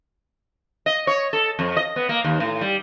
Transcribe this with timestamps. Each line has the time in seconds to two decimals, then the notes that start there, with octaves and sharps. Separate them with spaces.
0.86 D#5
1.07 C#5
1.33 A4
1.59 F2
1.77 D#5
1.96 B3
2.09 A#3
2.24 D#2
2.40 A2
2.61 G3